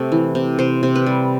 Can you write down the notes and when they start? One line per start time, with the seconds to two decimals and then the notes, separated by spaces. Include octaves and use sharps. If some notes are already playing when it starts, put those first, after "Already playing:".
Already playing: C3 A3
0.12 E3
0.35 C3
0.59 C3 C5
0.83 C3
0.95 B4
1.06 G3